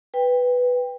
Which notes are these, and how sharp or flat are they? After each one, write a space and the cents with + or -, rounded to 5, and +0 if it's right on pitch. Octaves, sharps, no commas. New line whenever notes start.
B4 +0 G5 +20